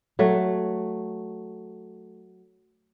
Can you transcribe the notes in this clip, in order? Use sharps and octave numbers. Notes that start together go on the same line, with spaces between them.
F#3 A3